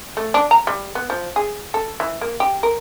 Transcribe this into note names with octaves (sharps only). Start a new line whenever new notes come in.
A3
D4
A#5
G3
B3
F3
G#4
A4
E3
A#3
G4
A#4